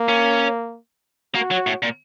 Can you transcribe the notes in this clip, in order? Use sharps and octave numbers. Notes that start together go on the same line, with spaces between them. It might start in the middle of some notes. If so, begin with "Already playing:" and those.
Already playing: A#3
C#4
A#3 F#4
F#3
A2
A#2